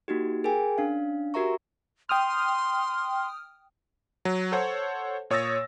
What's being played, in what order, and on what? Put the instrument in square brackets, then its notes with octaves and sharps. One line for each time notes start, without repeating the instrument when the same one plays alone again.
[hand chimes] A#3 D#4 F#4 G4
G#4 A#4 G5 G#5
C#4 D4 F5
F#4 G4 A#4 E5 A#5 C#6
[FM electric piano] G5 D#6 F6 [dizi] C6
[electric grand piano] F#3
A4 C5 C#5 F#5
A#2 C#5 D#6 E6 A6 A#6